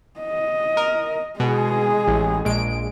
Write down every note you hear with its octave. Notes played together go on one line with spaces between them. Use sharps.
D#5
A#4
B2 G#3 G#4
A1
A#1 G#3 D7